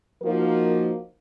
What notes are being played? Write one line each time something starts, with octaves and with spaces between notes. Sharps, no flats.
F3 A#3 D#4 F#4 A#4